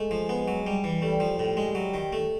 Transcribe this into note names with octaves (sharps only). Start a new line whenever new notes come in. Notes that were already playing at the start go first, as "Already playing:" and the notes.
Already playing: G#3 A3
F3
B3
F#3
G3
E3
G3 A3
F3
A2 G3
G#3
F#3
D#3
A3